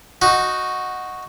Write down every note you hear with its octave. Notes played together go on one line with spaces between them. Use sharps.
D#4 F#4